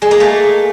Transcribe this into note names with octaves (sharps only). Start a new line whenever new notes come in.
G#3
A#3
A3